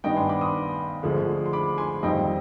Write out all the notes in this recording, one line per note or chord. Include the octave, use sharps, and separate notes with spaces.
G2 D#3 B3 D4 D#5 G5
G#5 C6
B5 D6
C6 D#6
D2 D3 F3 G#3
C6
B5 D6
G#5 C6
F2 D#3 G3 D#5 G5